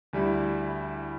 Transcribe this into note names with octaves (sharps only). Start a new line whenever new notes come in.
D2 G3 E4 B5